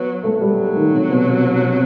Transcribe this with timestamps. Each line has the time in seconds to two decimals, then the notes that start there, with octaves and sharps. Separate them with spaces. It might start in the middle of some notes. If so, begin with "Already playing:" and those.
Already playing: F#3 B3
0.24 A3
0.41 F#3 G3
0.75 D#3
0.92 C3
1.10 B2
1.26 C3
1.44 C3
1.61 C3